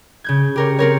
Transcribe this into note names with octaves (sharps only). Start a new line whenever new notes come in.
C#3 G6 G#6
G4 A#4 C#5
C4 A#4 C#5